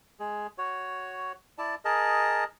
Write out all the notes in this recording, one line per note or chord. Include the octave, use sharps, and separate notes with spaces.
G#3 G#4
F#4 C#5
E4 D5 A5
G#4 A#4 D#5 A5